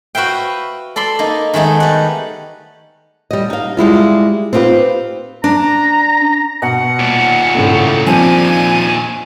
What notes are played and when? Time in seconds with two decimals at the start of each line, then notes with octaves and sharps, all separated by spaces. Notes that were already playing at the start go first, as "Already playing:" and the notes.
0.15 F#4 B4 E5 F5 G5
0.96 A4 D5 B5 C6
1.19 A#3 D#4
1.54 D#3 G#3 A3 B3 D#4
1.80 G3 F#5
3.31 G3 D#5
3.50 D#4 F5
3.77 G3 G#3 E4 F4
4.53 C4 D#4 F4 G4 B4
5.44 D4 A#5
6.62 B2 F#5
6.99 D#2 A#2
7.54 A2 C#3 A3
8.07 F3 C4 D4 G#5